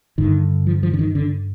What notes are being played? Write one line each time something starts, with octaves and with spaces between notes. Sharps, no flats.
G2 D3 D#3
F3
F3
D3
D#3
D3